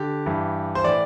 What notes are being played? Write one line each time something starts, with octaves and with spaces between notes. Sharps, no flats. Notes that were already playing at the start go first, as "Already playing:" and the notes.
Already playing: D3 G4
G2 E3
C5
A2 E3 D5